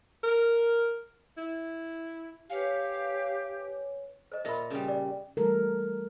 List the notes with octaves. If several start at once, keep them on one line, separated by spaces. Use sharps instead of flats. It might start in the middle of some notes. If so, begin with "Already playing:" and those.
A#4
E4
G4 B4 C#5 F5 G#5
C5 D#5
A#2 F4 E5 B5
C#3 G3
D5
E3 G3 A3 A4 A#4